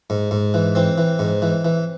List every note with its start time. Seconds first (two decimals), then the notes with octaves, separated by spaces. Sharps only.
0.10 G#2
0.31 G#2
0.54 E3
0.75 E3 C4
0.98 E3
1.19 G#2
1.42 E3
1.65 E3